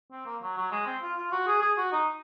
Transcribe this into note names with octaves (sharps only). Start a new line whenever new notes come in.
C4
A#3
F#3
F#3
G#3
C4
F4
F4
F#4
G#4
G#4
F#4
D#4